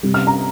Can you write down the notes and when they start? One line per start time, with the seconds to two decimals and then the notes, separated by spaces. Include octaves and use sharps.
0.03 C3 G3
0.14 F6
0.27 A#5